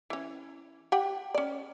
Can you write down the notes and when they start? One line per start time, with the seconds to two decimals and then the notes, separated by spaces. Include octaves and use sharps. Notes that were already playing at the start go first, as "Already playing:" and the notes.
0.10 E3 C#4
0.92 G4 F#5 G5
1.34 C#4 D5